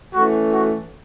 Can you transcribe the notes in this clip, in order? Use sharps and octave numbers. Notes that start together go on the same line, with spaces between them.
E3 A3 C#4 F#4
F#4